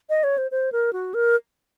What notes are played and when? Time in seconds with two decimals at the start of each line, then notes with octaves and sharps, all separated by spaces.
0.10 D#5
0.24 C#5
0.38 C5
0.51 C5
0.72 A#4
0.93 F#4
1.14 A#4